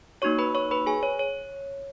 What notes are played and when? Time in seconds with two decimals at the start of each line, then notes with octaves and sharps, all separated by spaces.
0.22 A#3 D#4 F#4 C#5 C#6
0.39 B4 B5
0.55 C#5 C#6
0.71 B4 B5
0.86 G#4 G#5
1.03 C#5
1.19 C#5